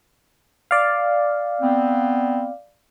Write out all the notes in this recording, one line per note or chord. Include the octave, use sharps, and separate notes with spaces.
D5 F5
B3 C4